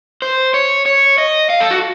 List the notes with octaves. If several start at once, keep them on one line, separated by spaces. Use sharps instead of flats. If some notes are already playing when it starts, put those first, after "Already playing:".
C5
C#5
C#5
D#5
F5
A4
F#4